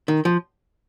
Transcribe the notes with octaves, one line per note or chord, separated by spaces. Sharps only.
D#3
F3